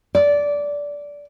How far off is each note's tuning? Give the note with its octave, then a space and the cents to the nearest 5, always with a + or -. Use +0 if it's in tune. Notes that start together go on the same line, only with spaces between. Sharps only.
D5 -15